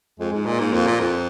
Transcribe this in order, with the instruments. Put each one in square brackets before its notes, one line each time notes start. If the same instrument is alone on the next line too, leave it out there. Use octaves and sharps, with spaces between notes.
[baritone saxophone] F2 [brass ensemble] G#3
[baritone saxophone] G#2
A#2
[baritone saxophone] G#2 [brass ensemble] A#3
[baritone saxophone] F2
A#2
F2